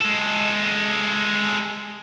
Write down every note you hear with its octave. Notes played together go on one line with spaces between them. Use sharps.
G#3 A4